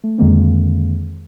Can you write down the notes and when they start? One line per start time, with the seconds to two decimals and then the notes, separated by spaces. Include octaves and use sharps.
0.04 A3
0.18 F2 D3 D#3 G#3 A#3 C4